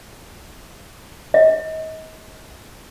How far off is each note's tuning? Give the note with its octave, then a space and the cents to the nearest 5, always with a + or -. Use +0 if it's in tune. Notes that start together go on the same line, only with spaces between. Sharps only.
D#5 +35